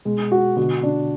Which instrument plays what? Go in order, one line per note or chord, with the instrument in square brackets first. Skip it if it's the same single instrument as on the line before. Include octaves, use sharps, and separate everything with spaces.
[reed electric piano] B2 [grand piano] G#3
[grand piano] F#4
[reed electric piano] B2 D3 [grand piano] F#4
[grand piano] D4